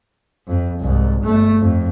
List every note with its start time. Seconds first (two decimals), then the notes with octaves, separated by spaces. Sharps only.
0.47 F2
0.80 C2 G#2
1.23 G1 A3
1.59 F2